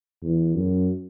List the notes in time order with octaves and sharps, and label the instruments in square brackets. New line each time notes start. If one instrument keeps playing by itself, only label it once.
[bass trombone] E2
F#2